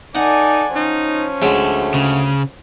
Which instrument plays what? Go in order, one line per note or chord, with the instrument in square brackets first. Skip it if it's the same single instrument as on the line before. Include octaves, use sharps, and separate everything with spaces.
[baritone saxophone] D#4 [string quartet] A4 D5 G#5 [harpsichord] F#5
[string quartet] F3 C#4 [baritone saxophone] D#4
[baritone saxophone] D2 [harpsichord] F#3 G#3 A3
[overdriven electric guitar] C#3